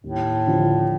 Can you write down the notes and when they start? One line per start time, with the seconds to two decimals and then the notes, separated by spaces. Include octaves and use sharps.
0.04 D#2 A2
0.47 D3 F3